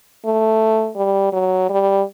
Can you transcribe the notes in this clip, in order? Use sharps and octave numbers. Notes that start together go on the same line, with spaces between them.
A3
G3
F#3
G3